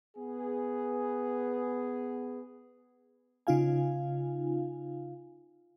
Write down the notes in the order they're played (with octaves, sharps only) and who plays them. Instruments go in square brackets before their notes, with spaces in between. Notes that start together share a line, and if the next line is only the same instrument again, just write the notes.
[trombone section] B3 G#4
[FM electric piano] C#3 D#4 F4 F5 G#5